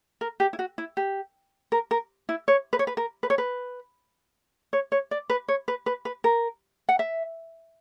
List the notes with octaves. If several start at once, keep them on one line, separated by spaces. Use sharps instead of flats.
A#4
G4
E4
F#4
E4
G4
A#4
A#4
E4
C#5
B4
C#5
B4
A#4
B4
C#5
B4
C#5
C#5
D5
B4
C#5
B4
B4
B4
A#4
F#5
E5